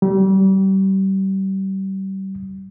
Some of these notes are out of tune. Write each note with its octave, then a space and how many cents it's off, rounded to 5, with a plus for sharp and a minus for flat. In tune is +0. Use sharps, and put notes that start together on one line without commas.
G3 -30